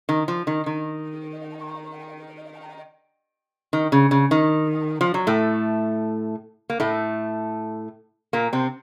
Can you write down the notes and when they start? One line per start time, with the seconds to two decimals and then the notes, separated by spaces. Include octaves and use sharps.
0.09 D#3
0.28 F3
0.47 D#3
0.66 D#3
3.73 D#3
3.92 C#3
4.11 C#3
4.31 D#3
5.01 F3
5.14 F#3
5.27 A2 A3
6.70 A#3
6.80 A2 A3
8.33 A#2 A#3
8.53 C3 C4